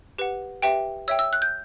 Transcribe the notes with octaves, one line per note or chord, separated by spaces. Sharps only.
G4 B4 F#5
G4 B4 E5 G5
C#5 E5 G5 E6
E6
F#6
G6